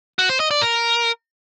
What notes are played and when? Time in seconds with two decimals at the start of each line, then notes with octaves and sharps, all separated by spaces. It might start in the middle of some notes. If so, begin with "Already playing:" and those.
0.19 F#4
0.29 C5
0.40 D#5
0.51 D5
0.61 A#4